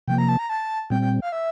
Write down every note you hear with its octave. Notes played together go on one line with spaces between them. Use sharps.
C3 F3 A#3 G5
A#5
A5
A#5
A5
A#2 G3 C4 G5
G5
F5
E5